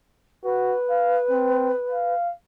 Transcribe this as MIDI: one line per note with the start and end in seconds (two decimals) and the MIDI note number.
0.44 0.74 66
0.44 2.14 71
0.90 1.18 77
1.31 1.72 60
1.91 2.31 77